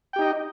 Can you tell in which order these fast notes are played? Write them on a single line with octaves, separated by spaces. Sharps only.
G5 G4 D#4 D#5